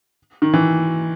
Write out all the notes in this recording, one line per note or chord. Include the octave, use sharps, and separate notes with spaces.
D#3
E3